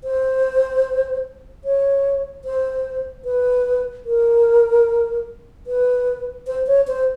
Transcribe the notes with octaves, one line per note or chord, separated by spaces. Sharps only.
C5
C#5
C5
B4
A#4
B4
C5
C#5
C5